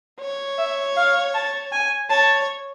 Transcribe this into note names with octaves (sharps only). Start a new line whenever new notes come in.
C#5
E5
F5
A5
G#5
C#5 A5